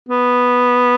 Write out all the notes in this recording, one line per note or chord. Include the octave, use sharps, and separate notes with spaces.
B3